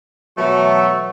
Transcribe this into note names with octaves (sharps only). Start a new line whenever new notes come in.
B2 E3 F#3 A3 C#6